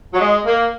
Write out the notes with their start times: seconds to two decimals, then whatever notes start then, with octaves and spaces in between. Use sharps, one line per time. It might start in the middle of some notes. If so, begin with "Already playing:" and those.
0.14 F#3
0.19 G#3
0.46 A#3